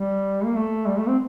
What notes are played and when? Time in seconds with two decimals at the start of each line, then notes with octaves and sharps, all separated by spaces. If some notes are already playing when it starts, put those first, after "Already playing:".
Already playing: G3
0.45 A#3
0.56 A3
0.87 G3
0.98 A3
1.08 C4